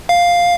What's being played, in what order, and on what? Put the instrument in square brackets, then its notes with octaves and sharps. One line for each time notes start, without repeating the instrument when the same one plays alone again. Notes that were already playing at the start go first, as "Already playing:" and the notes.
[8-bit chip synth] F5